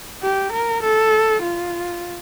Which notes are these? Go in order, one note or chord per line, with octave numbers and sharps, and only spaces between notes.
G4
A#4
A4
F4